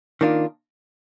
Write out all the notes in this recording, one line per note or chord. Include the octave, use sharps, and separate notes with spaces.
D#3 A#3 D4 F4